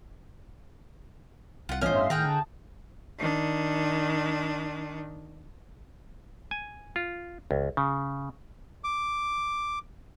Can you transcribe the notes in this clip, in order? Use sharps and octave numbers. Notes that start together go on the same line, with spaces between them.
C2 F4 F#5
A2 E3 C#4 F4 C5 D#5 F6
G2 E5 F5 C6
A2 D#3 G#4 F#5 G5 A#5 F6
D3 A5
D#3 D4
G#5
F4
C#2
C#3
D6